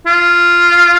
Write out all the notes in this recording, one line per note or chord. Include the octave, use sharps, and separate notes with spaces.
F4